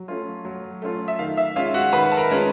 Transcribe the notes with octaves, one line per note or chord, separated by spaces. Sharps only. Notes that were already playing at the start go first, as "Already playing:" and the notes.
Already playing: F#3
A3 C#4 F4
F#3
A3 C#4 F4
E5
D#3 F5
E5
G#3 C#4 F4 F5
F#4 F#5
D#3 B4 B5
A5
A#4 A#5
G#3 C#4 F4